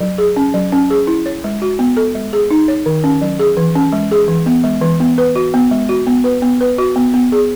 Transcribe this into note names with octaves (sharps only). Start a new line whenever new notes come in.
F#3
G#4
C#4
F#3
C#4
G#4
E4
C#5
G#3
F#4
B3
A4
G#3
G#4
D#4
C#5
D#3
C#4
F#3
G#4
E3
C#4
G#3
G#4
E3
B3
G#3
E3
B3
B4
F#4
B3
G#3
F#4
B3
B4
B3
B4
F#4
B3
B3
G#4